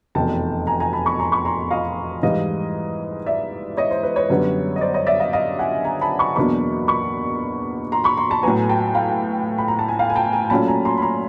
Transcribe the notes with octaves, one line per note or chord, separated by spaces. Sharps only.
F1 E2 B2 G5 A5
G#5 A#5
G#5 A#5
A5 B5
B5 C#6
A#5 C6
B5 C#6
A#5 C6
D#5 F5
G#2 E3 G3 D#5 F5
D5 E5
C#5 D#5
C5
B4
B4 C#5
F#2 D3 G3 B3
D#5
C5 D5
C#5 D#5
D5 E5
D#5 F5
D#5 F5
F#5 G#5
G#5 A#5
A5 B5
B5 C#6
E2 B2 F#3 A#3 D4 B5 C#6
B5 C#6
A#5 C6
B5 C#6
A#5 C6
A5 B5
A2 F#3 B3 G#5 A#5
G5 A5
F5 G5
B5
A#5
A5
G#5
F5 G5
G#5
G5 A5
G#5 A#5
A#2 F#3 A3 C#4 F4 A5 B5
G#5 A#5
A#5 C6
B5
A#5 C6